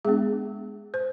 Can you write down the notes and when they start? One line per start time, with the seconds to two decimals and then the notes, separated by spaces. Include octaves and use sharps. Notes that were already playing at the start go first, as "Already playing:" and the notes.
0.05 G#3 B3 D4 G#4
0.94 C5